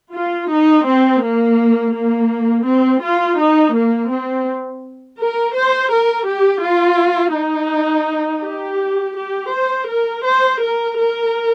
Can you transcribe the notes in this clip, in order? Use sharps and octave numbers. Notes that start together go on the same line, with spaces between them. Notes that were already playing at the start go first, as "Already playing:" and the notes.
F4
D#4
C4
A#3
A#3
C4
F4
D#4
A#3
C4
A#4
C5
A#4
G4
F4
D#4
G4
G4
C5
A#4
C5
A#4
A#4